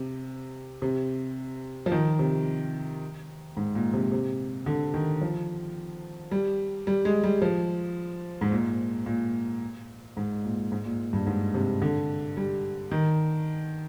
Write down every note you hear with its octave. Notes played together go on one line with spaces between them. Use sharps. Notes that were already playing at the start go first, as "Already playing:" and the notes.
Already playing: C3
C3
F3
D#3
C3
G#2
A#2
C3
C3
D3
D#3
F3
G3
G3
G#3
G3
F3
G#2
A#2
A#2
G#2
A#2
G#2
A#2
G2
G#2
C3
D3
G3
D#3